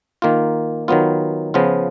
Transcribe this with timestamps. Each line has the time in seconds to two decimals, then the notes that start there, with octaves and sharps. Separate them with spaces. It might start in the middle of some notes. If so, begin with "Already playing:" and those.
0.22 D#3 A#3 F4
0.88 D#3 F#3 B3 F4
1.54 C#3 F3 B3 F4